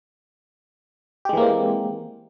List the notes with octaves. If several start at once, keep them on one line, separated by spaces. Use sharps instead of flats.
E3 G#3 A#3 C4 G4